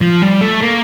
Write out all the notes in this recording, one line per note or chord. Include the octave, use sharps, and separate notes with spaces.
F3
G3
A3
A#3